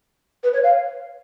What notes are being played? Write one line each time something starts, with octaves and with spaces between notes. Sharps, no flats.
B4
C#5
F5